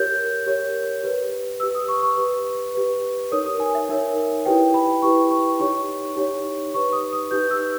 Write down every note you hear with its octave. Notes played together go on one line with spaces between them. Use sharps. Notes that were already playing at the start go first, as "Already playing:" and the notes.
Already playing: G4 A#4 C#5 G6
G4 A#4 C#5
G4 B4
G4 B4 E6
D#6
C#6
C#6
G4 B4
G4 B4
D#4 A#4 C#5 D#6
D#6
G#5
E5
D#4 A#4 C#5
E4 G4 B4 G5
B5
E4 G4 B4 C#6
C#6
D#4 G4 C#5 C#6
D#4 G4 C#5
D#4 G4 B4 C#6
D#6
D#6
D#4 G4 B4 G6
E6